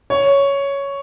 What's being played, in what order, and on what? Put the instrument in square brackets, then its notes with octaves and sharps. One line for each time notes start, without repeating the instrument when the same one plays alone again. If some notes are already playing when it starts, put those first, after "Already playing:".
[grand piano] C#5